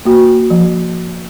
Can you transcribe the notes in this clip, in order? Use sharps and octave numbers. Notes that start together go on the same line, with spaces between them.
A#3 F#4
F3